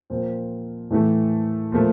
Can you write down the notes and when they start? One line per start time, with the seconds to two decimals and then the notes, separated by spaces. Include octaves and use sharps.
0.10 A#2 F3 C4
0.90 A2 E3 A3
1.72 A#2 F3 A3